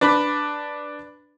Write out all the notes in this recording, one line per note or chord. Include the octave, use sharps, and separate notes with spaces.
D4 B4 B5